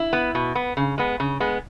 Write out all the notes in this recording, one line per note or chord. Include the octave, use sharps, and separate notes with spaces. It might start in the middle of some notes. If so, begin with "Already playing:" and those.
Already playing: E4
B3
B2
B3
C#3
G#3 B3
C#3
G#3 B3